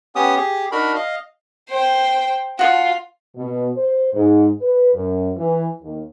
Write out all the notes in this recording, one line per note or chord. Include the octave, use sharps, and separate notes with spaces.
B3 C#4 G4 D#6
G4 G#4
D4 D#4 F#4 A#4 B5
D#5 F5
C5 G5
F4 F#4 F#5 A5
B2
C5
G#2
B4
F#2
E3
D#2